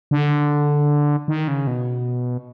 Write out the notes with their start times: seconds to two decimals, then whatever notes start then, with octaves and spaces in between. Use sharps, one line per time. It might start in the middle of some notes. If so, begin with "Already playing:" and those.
0.11 D3
1.28 D#3
1.48 C#3
1.67 B2